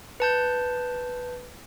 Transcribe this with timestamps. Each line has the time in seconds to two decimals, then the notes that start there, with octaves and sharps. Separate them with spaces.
0.20 B4 A5 G6